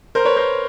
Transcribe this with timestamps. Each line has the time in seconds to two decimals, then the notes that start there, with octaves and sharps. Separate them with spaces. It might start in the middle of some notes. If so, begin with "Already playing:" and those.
0.15 A#4 C5
0.25 B4 C#5
0.36 A#4 C5